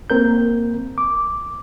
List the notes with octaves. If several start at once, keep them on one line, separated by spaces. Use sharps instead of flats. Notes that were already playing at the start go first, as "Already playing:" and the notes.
A#3 C4 A#4 G6
D6